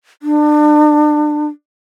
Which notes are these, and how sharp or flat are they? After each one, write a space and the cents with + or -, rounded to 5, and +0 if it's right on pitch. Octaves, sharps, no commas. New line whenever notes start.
D4 +30